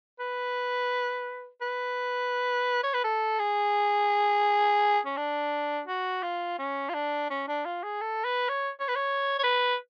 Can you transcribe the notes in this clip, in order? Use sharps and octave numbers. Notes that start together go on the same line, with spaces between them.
B4
B4
C#5
B4
A4
G#4
C#4
D4
F#4
F4
C#4
F4
D4
C#4
D4
F4
G#4
A4
B4
C#5
C#5
B4
C#5
C#5
B4